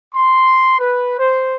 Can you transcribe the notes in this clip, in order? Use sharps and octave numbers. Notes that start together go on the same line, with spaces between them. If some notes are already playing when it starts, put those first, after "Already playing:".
C6
B4
C5